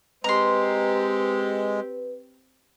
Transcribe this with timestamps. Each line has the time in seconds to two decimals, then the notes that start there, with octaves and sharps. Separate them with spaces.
0.24 G#3 C4 G4 B4 A#5 C6